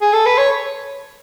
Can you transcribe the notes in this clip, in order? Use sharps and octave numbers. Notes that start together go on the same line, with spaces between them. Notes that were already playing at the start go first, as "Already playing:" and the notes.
G#4
A4
B4
C#5